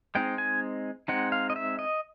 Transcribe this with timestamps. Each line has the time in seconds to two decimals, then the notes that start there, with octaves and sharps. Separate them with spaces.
0.15 G#3 C4 D#4 G5
0.38 G#5
1.08 G#3 C4 D#4 F#5
1.32 F5
1.50 D#5
1.56 E5
1.79 D#5